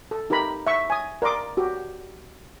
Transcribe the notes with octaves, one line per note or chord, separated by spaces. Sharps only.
A4
D#4 G4 A#4 A#5 B5
E5 C#6
G#5 D#6
A#4 D5 C6 D6 D#6
F#4 G4